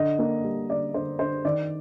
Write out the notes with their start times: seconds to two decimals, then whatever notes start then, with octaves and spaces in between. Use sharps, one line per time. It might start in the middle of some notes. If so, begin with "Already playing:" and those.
Already playing: D3 D#5
0.19 A#3
0.44 G3
0.69 D3 D5
0.94 D3 C5
1.19 D3 C5
1.45 D#3 D5